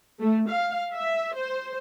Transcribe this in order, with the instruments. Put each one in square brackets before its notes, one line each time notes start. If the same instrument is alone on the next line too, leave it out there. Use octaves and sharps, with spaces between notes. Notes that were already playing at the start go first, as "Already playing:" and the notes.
[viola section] A3
F5
E5
C5